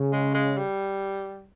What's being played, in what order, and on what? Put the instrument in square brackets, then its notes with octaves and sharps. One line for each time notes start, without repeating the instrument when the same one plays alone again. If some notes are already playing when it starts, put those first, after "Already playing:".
Already playing: [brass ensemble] C#3
[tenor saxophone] G#3
G#3
G3